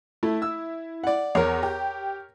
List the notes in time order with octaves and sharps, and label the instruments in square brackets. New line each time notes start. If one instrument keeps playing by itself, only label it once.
[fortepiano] A3 [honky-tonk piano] E4
[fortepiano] E6
D5 F#5
[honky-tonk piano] E2 [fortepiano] A#4 C#5
[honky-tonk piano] G4